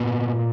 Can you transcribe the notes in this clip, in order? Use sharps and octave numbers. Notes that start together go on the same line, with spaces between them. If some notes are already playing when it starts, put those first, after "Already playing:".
Already playing: A#2 B3